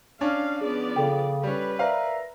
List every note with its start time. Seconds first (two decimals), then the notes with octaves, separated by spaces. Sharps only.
0.21 C#4 D4 F5
0.61 F3 B3 G#4 D5
0.96 C#3 A4 G5
1.43 G3 C#4 B4
1.79 A#4 C5 D5 E5 F5 A#5